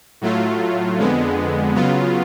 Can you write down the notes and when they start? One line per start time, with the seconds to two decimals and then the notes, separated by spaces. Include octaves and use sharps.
0.21 A2 F#3 A3 F4
0.98 F2 D3 G#3 B3
1.75 C#3 F#3 B3 F4